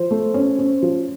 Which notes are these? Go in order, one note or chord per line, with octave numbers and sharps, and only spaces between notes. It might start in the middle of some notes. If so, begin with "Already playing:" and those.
Already playing: F3 C5
A3
C#4
C#4
F3